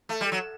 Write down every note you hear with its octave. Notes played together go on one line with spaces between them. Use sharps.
A3
G3
F#3